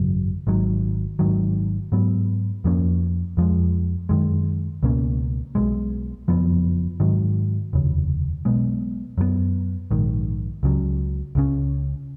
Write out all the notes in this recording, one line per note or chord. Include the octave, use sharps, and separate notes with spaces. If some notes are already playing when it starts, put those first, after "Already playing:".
Already playing: G#1 F#2 C#3 F#3
G#1 G#2 D#3 F#3
G#1 G#2 D#3 F#3
G#2 F#3 B3
F2 F3 A#3 C#4
F2 F3 G#3
F#2 D#3 G#3
C#2 B2 A#3 C#4
B1 B2 G#3
F#1 F2 F3 B3
G#2 D#3 F#3
F1 D#2 C#3
B1 B2 G#3 B3
F#2 F3 B3
A#1 G#2 D#3
C#2 C#3 F#3
C#2 C#3 F#3 C#4